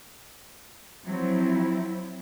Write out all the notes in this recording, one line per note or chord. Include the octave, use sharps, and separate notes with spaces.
F3 F#3 C4 E4